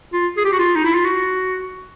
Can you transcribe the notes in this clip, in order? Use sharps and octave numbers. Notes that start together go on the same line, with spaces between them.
F4
G#4
G4
F#4
F4
D#4
E4
F4
F#4